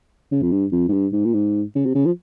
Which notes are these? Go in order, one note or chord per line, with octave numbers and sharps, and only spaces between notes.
C#3
F2
G2
F2
G#2
G2
G#2
A#2
G#2
C#3
C3
C#3
F3